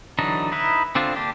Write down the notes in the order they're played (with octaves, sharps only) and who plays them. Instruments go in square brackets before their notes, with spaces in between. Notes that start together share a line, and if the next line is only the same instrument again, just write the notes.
[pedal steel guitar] D3 E3 F#3 D4 D#4
D#4 E4 B4
D3 C4 D4 F4
A#3 D4 G4